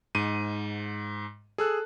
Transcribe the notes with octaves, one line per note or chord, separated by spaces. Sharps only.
G#2 D#7
G#4 A4 E6 F#6